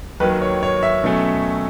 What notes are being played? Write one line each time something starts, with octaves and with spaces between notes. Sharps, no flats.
D#2 D#3 F#3 B4
C#5
C#5
E5
B2 F#3 A3 C#4